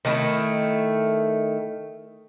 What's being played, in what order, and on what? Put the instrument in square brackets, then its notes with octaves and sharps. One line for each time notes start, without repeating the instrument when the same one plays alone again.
[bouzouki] D#3 A3 E4